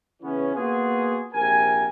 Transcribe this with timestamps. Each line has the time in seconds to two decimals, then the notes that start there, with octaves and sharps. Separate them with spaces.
0.22 C#3 E3 B3 C#4
0.55 A#3 B3 F4 F#4 G#4
1.34 A#1 C3 A#4 G#5